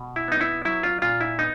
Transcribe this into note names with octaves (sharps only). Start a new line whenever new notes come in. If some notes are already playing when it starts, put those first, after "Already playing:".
Already playing: B2
E4
B3 D#4
E4
F#3 E4
F4
A#2 F4
E4
B3 D#4